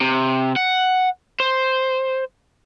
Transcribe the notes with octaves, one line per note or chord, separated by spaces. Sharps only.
C3
F#5
C5